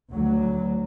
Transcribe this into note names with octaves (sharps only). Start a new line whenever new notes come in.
D2 F#3